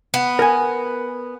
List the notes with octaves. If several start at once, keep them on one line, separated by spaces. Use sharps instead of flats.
B3
A#4 G#5